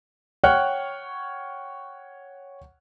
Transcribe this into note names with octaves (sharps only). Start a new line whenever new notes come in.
C#5 F#5 G5 C#6 F6 F#6